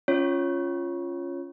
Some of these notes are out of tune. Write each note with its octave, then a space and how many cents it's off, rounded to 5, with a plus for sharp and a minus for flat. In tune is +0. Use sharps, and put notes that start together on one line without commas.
C#4 +0 F4 -5 C#5 -5